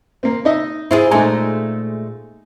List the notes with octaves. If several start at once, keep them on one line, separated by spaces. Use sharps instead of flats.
A#3 C4
D#4 D#5 E5
C4 E4 F4 G#4
A#2 G#3 A3 D#4 G#5